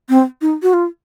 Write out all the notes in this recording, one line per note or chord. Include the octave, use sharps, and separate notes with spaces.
C4
D#4
F#4
F4